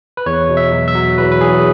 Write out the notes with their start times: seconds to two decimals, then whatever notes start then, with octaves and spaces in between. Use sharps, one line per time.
0.17 B4
0.26 E2 C#5
0.49 B2
0.57 E5
0.72 F#3
0.88 E5
0.95 F#3
1.18 E2 B4
1.32 B4
1.41 E2 G#4